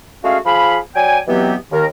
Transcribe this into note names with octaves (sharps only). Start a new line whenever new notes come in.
G#3 A3 C#4 F#4 G#4 F5
F3 G#4 F5 B5
F#3 D5 G5 G#5
B2 E3 F#3 B3 C4 G4
D#2 D#3 A#4